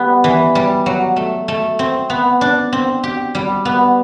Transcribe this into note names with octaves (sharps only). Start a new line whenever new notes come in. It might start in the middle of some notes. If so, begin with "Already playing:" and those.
Already playing: G3 B3
E3
G3
F#3
A3
A3
C4
B3
D4
C4
G4
G3
B3